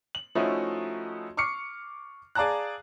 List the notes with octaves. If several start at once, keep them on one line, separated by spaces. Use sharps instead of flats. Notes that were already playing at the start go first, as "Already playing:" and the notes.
F#7
F3 A3 C#4 D#4 E4 F#4
C#6 D6 F6 C7 C#7
G#4 D5 F5 A5 A#5 F#6